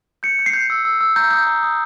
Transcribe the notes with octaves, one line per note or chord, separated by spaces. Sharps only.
G6 C#7
G6
C7
G6
E6
E6
E6
A#5 G6
D#6 G6
A#5
D#6